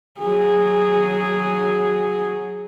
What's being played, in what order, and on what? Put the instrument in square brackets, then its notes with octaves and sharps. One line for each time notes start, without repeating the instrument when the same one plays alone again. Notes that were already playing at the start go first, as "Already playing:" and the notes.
[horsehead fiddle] F#3 G#4